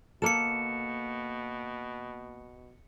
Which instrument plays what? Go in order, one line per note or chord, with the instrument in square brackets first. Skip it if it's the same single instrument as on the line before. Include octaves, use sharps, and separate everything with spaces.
[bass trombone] B2 [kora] A#3 A4 [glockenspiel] C#7 E7